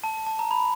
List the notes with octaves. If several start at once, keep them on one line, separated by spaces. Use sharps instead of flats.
A5
A5
A#5
B5